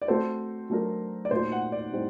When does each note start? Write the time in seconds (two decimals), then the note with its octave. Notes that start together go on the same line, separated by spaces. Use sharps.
0.02 D5
0.08 A3 C4 F#4 A4 C5
0.70 F#3 A3 D4 F#4 A#4
1.25 D5
1.31 A#2 A3 D#4 F#4 C5
1.52 F#5
1.72 D5
1.92 A2 G3 C4 D#4